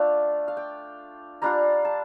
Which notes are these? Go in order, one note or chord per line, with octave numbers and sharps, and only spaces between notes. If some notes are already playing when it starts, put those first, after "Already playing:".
Already playing: A3 D4 F4 F5
F5
G5
G3 D4 F4 A#5
A5